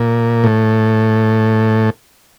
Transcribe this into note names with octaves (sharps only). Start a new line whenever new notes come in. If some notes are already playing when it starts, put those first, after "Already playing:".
Already playing: A#2
A2